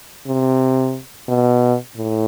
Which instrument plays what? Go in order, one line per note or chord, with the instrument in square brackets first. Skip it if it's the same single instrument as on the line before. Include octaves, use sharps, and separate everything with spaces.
[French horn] C3
B2
A2